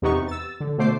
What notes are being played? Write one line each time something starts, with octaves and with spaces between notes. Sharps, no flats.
E2 C3 B3 D#4 C#6
E6 A6
D3
B2 D3 A3 C5 D6 C7